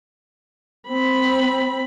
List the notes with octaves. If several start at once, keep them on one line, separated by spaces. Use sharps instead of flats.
C4 B5